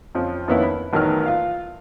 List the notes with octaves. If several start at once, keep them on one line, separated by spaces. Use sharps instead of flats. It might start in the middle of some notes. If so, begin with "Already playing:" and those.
F2 F3 C#4
F2 D#3 A#3 B3 C#4 E4
B5
A1 D#3 F#3 B3 F6
F4 F5